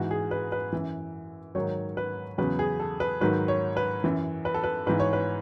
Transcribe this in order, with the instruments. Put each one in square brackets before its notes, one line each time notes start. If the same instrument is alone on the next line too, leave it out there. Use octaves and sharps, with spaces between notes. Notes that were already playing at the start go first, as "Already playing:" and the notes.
Already playing: [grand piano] G#2 E3 F#4
G#4
B4
B4
F#2 E3
G#2 D#3 F#3 C#5
B4
E2 C#3 F#3 B4
G#4
A4
B4
G#2 D#3 F#3 B4
C#5
B4
F#2 E3
B4
A4
B4
G#2 E3 B4
C#5
B4